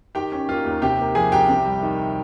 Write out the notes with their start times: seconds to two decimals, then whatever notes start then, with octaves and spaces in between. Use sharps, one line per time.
0.15 D#3 G4 G5
0.32 C#4
0.49 A#3 F4 F5
0.65 D#2
0.82 C3 G4 G5
0.99 A#3
1.15 F3 G#4 G#5
1.32 C2 G4 G5
1.49 C3
1.66 G3
1.83 D#3